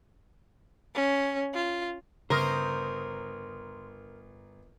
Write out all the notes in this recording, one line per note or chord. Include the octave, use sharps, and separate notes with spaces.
C#4
F4
G1 C#3 A#4 C5 D#6